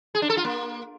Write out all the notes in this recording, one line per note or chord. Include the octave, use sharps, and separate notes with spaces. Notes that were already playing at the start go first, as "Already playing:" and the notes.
G#4
D4
A4
F4
A#3